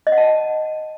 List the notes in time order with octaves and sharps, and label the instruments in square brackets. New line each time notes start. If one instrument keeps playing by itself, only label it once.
[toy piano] D#5
F#5
A5